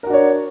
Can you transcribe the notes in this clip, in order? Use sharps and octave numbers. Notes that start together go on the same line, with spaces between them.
D4 F#4 A#4 C#5